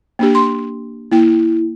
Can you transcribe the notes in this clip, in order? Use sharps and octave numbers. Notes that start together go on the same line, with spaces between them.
A#3 D4 G4
C6
A#3 E4 G5